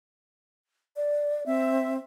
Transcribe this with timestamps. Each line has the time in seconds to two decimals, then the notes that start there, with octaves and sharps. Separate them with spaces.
0.96 D5
1.46 C4 E5